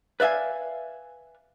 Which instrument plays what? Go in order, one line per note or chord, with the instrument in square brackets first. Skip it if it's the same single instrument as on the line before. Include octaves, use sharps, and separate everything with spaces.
[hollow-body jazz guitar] B4 D5 E5 F5 G#5